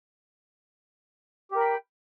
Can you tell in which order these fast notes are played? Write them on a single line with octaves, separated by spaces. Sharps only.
G4 A#4 B5 G5